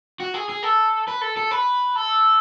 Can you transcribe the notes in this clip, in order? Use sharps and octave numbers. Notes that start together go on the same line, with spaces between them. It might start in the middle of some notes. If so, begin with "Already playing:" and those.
F#4
G#4
G#4
A4
B4
A4
A4
B4
A4